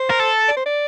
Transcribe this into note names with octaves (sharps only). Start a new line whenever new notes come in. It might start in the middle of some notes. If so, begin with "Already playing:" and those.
Already playing: C5
A#4
A4
D5
C5
D5